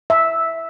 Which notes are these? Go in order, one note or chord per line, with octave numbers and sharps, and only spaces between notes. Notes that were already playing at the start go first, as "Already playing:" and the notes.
E5